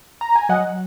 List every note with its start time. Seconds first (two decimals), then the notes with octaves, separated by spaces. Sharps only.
0.21 A#5
0.36 G#5
0.49 F#3 D#5 F#5